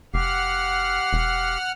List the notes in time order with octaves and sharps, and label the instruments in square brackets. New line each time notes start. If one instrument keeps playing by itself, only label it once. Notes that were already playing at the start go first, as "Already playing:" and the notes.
[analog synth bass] F1 [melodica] G4 F5 [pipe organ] F#5 F6
[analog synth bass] E1